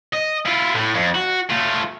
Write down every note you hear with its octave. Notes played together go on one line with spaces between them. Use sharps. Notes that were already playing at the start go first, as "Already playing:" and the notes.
D#5
E4 F4
A2
F2
F#4
A3 F4